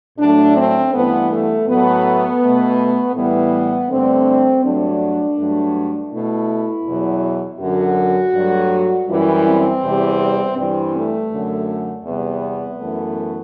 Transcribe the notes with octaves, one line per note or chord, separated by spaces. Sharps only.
A2 F#3 A3 D4
C4
G2 E3 A3 B3
A3
A2 F#3 A3 B3
B2 A3
A2 E3 G3 B3
G2 D3 A3 C4
G2 F#3 A3 D4
G2 F#3 A3
B2 A3 E4
E2 B2 F#3
F#2 D3 F#3 F#4
G2 F#3 A3
F#2 E3 G3 E4
C4
E2 C3 E3 G3
G2 E3 G3 C4
A3
F#2 D3 F#3
E2 C3 G3 B3
F#2 E3 A3